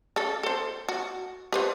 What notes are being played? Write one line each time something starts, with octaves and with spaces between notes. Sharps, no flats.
C#3 A4
A4 C5
F#4
G4 B4 C5